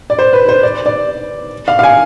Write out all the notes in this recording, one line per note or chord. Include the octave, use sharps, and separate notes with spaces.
D5
C5
B4
C5
D5
D5
F5
F5
G#5